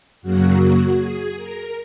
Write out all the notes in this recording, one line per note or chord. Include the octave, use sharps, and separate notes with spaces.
F#2 C#3 F#3 A#3 F#4
G#4
A#4